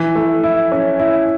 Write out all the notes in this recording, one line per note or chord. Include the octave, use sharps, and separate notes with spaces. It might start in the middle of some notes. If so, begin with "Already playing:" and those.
Already playing: E3
A3
E4
C#4
E4